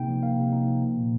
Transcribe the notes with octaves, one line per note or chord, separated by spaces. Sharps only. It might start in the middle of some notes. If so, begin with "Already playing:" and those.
Already playing: C3 A#3 D#4 G5
F3
A#3 F5
C3
D#4
F3
A#3
A#2